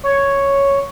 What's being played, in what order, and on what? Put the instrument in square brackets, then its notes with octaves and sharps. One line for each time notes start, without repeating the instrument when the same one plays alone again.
[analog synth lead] C#5